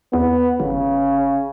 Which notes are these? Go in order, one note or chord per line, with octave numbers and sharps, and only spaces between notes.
E2 B3
G1 C#3